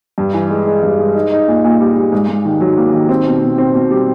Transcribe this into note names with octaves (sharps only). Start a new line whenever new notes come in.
G2
E3
G#3
G#3
G2
G#3
D#4
D#4
A#2
A#2
G3
G3
G#2
G#2
D#3
F#3
A#3
D#3
C4
B2
B2
C4
B2
G3